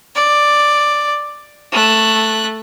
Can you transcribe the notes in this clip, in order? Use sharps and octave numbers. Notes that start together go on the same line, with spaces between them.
D5
A3 F#6